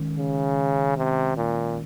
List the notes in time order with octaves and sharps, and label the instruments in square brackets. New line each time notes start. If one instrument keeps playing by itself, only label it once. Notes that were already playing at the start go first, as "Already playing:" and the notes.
Already playing: [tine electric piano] D#3 G#3 C#4
[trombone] C#3
C3
A#2